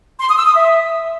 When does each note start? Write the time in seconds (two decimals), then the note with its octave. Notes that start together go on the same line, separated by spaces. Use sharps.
0.20 C6
0.29 D#6
0.37 E6
0.46 D#6
0.55 E5